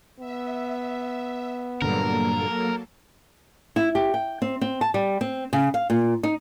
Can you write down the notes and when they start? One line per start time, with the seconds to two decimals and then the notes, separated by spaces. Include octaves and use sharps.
0.20 B3 E5
1.82 G2 A#2 D3 F#3 A#3 A4 A#4
3.76 E4
3.95 G4
4.14 G5
4.42 C4
4.61 C4
4.81 A5
4.94 G3
5.21 C4
5.53 C#3
5.74 F5
5.90 A#2
6.23 D#4